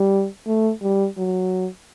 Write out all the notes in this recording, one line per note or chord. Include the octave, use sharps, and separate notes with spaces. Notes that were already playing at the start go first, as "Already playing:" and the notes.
Already playing: G3
A3
G3
F#3